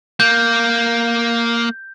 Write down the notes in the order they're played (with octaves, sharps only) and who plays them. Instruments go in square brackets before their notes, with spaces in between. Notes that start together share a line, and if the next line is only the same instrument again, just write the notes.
[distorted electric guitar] A#3 [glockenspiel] G6